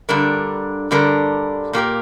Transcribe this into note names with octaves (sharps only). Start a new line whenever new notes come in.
G2 D3 G3 D4 A#4
G2 D3 G3 D4 A#4
A#2 A#3 G4 A#4